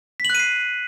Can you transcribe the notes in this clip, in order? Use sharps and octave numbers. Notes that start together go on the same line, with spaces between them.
F#6 B6 C7 D#7 F#7